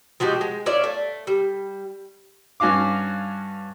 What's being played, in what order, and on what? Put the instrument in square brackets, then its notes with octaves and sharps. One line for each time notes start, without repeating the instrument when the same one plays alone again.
[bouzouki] F3 G#3 F#4 G4
G#3
F4 C#5 D5 E5
A3
G3
[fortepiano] G2 C#4 F#4 F5 D6